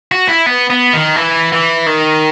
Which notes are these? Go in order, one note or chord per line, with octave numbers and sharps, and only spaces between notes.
F#4
E4
B3
B3
D#3
E3
E3
D#3